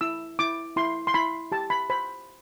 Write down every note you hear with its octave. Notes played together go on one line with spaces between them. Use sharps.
E4 E6
E4 D6
E4 C6
C6
E4 B5
G4 A5
B5
C5 B5